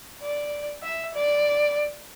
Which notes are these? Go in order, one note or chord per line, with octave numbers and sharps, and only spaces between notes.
D5
E5
D5